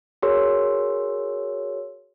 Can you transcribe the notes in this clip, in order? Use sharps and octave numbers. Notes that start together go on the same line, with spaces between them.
F#4 G#4 A#4 C#5 C6 E6